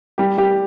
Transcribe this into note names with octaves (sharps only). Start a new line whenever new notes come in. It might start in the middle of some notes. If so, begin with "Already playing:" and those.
G3 G4
G3 G4